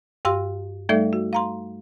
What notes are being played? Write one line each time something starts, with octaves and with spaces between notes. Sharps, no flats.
G2 G4 F5 C6 E6
G3 A3 D#4 A4 D5 E5
F#4
F5 A#5 C6